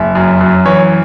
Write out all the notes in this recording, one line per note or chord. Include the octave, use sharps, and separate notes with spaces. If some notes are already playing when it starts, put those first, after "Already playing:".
Already playing: F#1 E5
F#2
F#2
E3 C#5